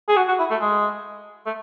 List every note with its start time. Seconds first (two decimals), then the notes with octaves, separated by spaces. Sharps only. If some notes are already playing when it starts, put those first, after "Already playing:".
0.08 G#4
0.16 F#4
0.28 F#4
0.39 E4
0.50 A3
0.61 G#3
1.46 A3